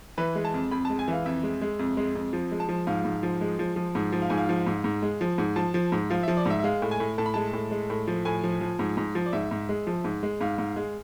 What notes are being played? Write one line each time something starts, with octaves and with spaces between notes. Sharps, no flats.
E3 B4
G#3
A5
F2
F2 B5
A5
G#3
G#5
E3 F5
F2 E5
G#3
G#3
F2
G#3
F2
F3
G#3
A5
F3
G#2 F5
G#2
F3
G#3
F3
F3
G#2
F3
F5
G#2 G#5
F5
F3
G#2
G#2
G#3
F3
G#2
F3 A5
F3
G#2
F3 F5
E5
F3
D5
G#2 E5
E5
G#3 F5
A2
G#5
A2
A2 A5
B5
G#3 A5
A2
G#3
A2
F3
A2 G#5
F3
F3
G#2
G#2
F3
D5
G#2 E5
G#2
G#3
F3
G#2
G#3
G#2 F5
G#2
G#3